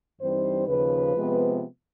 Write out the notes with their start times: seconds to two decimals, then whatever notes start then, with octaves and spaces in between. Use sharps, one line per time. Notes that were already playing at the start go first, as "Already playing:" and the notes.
0.20 G2 E3 G3 C4 D#4 C5
0.68 D#2 C#3 F3 B4
1.16 C3 F3 G#3 B3